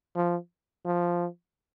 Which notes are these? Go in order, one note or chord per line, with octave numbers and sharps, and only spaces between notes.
F3
F3